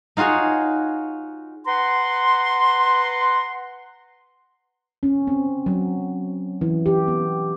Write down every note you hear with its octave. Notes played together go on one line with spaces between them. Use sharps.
D#4 F4 F#4 G#4 C#5
B4 F#5 A#5 C6
C#4
C4
F#3
E3
G4
B3